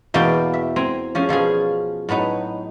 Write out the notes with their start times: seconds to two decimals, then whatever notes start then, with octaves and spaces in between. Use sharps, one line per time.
0.14 E2 B2 A#3 A#4 D5 G5
0.53 E5
0.76 C4 G#5 A#5
1.15 F3 C#4 G#4
1.29 B2 F3 C#4 G#4
2.09 A2 F#3 B3 D#4